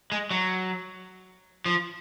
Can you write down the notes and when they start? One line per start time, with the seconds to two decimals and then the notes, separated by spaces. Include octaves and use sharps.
0.12 G#3
0.31 F#3
1.66 F3